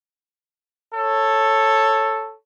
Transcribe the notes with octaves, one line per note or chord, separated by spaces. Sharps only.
A4 C#5